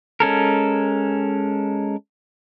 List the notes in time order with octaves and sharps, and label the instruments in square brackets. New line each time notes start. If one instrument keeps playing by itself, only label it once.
[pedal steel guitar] G#3 C#4 A4 A#4